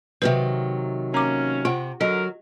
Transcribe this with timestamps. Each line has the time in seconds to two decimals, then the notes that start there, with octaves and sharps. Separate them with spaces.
0.22 C3 D#3 F#3 B4
1.14 A#3 C#4 A#5 D6
1.65 C3 F4 F#5
2.01 D3 F#3 A#4 D#5